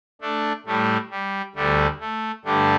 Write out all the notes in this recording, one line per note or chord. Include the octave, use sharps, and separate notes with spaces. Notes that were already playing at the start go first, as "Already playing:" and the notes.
A3 D4
A2 G3 A3
G3
D2 D3 G3 A3
A3
G2 D3 G3 A3 D4